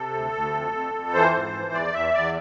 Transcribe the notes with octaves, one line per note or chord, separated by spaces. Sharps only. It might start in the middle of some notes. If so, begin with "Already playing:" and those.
Already playing: C3 A4
D2
D2
F2
F2
F2
E3 C5
G#2
E3
E2 D5
E2 E5
E2 D5